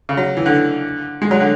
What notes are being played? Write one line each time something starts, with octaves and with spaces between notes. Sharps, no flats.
C#3
F#3
E3
D3
G#3
F#3
D3